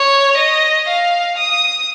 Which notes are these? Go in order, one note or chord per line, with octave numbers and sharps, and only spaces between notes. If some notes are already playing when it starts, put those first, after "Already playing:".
Already playing: C#5
D#5
F5
D#6